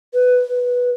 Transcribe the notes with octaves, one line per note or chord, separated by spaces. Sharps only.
B4